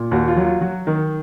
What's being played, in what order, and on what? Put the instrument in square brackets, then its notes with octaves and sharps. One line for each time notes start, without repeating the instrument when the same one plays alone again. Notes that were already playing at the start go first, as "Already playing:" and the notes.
Already playing: [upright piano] A#2
D#2 F#4
F4
F#3
F4
F#3 F#4
D#3